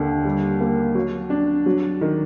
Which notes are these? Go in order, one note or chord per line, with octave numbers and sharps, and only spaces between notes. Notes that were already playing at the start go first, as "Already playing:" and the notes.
Already playing: D#2 D3
G3
A#3
F#3
D4
F#3
D#3